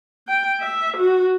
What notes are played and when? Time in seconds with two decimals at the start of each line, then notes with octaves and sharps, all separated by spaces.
0.28 G5
0.61 E5
0.97 F#4